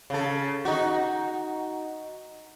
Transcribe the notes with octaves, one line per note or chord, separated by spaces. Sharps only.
C#3 A4
D#4 F#4